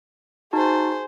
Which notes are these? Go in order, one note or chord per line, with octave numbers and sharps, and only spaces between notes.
D#4 F#4 G#4 C5 A5